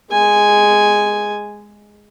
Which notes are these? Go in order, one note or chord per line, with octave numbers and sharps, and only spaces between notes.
G#3 G#5